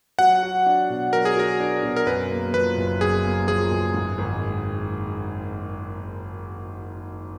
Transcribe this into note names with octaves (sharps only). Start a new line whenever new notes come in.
F#3 F#5
F#4
D4
B2
F#3 A#4
G#4
F#4 A#4
D4
B2
A#4
F#2 B4
A#3
F3 B4
F#1
F#2 G#4
A#3
F3 G#4
F#1
G#2
G#1